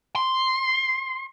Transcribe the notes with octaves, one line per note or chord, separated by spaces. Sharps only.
C6